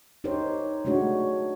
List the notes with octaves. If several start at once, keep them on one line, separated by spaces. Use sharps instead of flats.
D#4 G4 A#4 C5 C#5
G#3 A3 D4 F#4 C#5